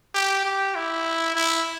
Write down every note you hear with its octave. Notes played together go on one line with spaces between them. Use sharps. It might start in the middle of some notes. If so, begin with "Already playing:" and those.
G4
G4
E4
E4